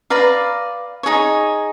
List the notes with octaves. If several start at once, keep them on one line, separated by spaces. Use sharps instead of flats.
B4 D5 F5 A#5
D#4 G#4 C#5